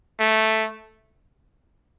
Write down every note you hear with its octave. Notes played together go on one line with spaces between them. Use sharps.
A3